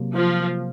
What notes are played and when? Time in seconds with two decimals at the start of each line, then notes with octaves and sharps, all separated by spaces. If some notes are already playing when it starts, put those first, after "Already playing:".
Already playing: C3 F#3 A#3
0.14 F3